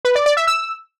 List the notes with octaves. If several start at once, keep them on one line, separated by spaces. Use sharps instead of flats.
B4
D5
D5
E5
E6